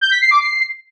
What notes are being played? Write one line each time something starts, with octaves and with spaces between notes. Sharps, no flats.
G6
B6
C7
D6
C7